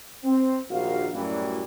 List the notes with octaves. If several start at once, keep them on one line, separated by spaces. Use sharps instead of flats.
C4
A#1 D#2 F#4 F5
F#2 A2 E3 F#3 G3